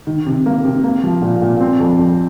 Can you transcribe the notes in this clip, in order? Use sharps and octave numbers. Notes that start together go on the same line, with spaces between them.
D#3
C3
A#3
C3
A#3
F3
A#2
A#2
C4
F2
F2